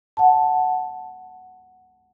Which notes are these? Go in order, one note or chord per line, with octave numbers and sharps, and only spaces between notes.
F#5 A5